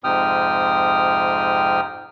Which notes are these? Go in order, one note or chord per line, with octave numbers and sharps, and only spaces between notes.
F2 G#2 C3 G5 D#6 F6